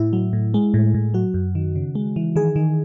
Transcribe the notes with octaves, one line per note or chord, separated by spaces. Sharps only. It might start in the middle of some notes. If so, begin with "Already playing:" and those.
Already playing: A2 E4
F#3
A2
G#3
A2
A2
F#3 F#4
F#2
D#3
C#3
G#3
E3
D#3 G#4
D#3